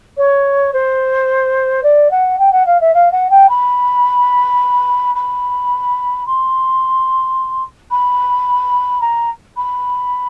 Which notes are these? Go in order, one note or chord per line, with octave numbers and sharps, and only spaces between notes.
C#5
C5
D5
F#5
G5
F#5
F5
E5
F5
F#5
G5
B5
B5
C6
B5
A#5
B5